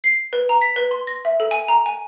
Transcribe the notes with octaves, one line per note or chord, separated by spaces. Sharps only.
C7
B4
A#5
B6
B4
C6
A#6
E5
A4
G#5
A#5
G#5